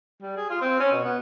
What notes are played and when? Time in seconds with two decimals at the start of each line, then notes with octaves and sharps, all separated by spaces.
0.22 G3
0.37 G#4
0.50 F4
0.62 C4
0.80 C#4
0.92 B2
1.04 B3